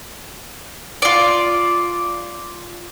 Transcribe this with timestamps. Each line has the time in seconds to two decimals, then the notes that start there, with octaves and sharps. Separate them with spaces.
1.02 F4 D5